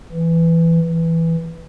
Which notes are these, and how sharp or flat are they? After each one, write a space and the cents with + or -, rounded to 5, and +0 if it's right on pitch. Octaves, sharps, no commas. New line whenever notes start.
E3 +10
E3 +0